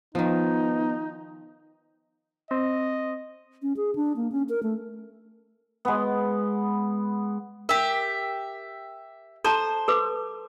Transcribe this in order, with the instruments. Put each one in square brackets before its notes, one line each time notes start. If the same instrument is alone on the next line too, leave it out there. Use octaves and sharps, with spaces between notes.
[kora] D#3 F3 [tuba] B3 [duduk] D#4
[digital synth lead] C4 [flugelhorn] D#5
[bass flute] C#4
G#4
D4
A#3
C#4
A#4
A3
[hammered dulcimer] G#3 B3
[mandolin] G4 E5 [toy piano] A#4
[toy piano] A4 A5 A#5 [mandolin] C5
[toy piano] A4 B4 D6